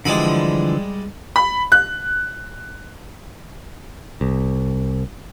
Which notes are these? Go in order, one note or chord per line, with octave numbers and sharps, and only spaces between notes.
D3 E3 F3 G3 G#3 B5
B5
F#6
C2